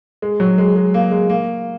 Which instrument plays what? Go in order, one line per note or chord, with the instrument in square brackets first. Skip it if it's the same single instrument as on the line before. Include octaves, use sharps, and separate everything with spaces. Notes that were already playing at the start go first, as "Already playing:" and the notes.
[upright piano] G#3
F#3
G#3
G#3
A#3
G#3
A#3